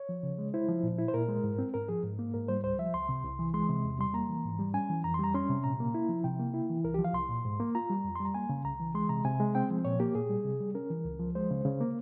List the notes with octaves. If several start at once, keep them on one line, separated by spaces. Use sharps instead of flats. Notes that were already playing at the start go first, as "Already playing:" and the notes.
Already playing: C#5
F3
C#3
G#3
E4 C5
F3
A#2
E4
C5
A#2 A#4
G#3
G#2
C4
G#2 A#4
F3 G#4
G#2
A#3
G#2 A#4
G3 C5
C#2 C5
F3 E5
C#2 C6
C3
C2
E3
G#3 C6
C3
E2
G3 C6
A#3 A#5
E3
G#2
G3
C#4 G#5
E3
F2 A#5
C6
G3 A#5
C#4 C6
C3
A#2 A#5
A#3
E4
F3
C3 G5
A#3
E4
E3
C2 A#4
G4
F3
F5
C2 C6
A#2
G#2
A#3
F4 A#5
G3
F2
G3 C6
A#5
A#3 G#5
C#3
C2 A#5
E3
G#3 C6
C3 A#5
C3 G#5
G#3
C4 G5
F3
A#2 C#5
A#3 G4
A#2 G#4
G3
C3
G3
C#4 A#4
E3
C#2
F3
G#3 C5
C#3
C#3
A#3